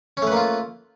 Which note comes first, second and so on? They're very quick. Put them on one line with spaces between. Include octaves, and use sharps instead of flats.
C#4 A3 B4 A#3 F4